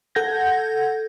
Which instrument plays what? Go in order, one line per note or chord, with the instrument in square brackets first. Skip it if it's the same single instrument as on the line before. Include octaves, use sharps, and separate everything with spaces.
[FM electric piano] A4 F#5 G6 G#6 A#6